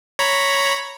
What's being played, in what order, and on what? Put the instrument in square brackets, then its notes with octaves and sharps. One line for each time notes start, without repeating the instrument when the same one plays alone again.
[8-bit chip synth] C#5 A#5 B5